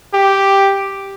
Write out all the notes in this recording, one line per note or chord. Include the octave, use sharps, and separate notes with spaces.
G4